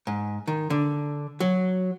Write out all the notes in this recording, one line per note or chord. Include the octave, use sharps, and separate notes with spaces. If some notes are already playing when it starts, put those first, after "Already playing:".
G#2
D#3
D3
F#3